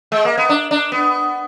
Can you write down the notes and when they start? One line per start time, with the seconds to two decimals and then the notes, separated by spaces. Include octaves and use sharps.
0.12 G#3
0.25 A#3
0.38 B3
0.49 D4
0.71 D4
0.92 B3